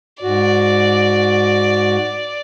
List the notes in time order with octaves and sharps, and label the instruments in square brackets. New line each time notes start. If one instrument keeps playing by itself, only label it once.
[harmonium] G#2 F#4 [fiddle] D5